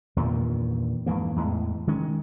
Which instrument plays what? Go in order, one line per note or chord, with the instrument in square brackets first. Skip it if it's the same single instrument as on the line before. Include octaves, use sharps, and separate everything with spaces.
[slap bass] E2 G2 A#2 D#3
F2 G#2 E3 A#3
E2 A2 G#3
D#3 G#3 C#4